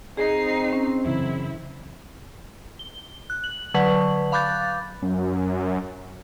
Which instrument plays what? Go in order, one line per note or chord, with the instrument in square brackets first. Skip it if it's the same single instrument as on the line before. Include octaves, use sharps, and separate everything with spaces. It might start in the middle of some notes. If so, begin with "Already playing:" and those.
[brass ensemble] C4 [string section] D#4 C7 [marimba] G#4
[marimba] C#4
[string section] F#2 E4 [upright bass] C#3 E3
[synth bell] G7
F#6
F#7
D3 F#3 B4
F5 B5 D6 F#6 G6 A6
[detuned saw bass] F#2